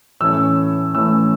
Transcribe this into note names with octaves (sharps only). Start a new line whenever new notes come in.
A2 E3 A3 C#4 E6
A2 E3 A3 C#4 E6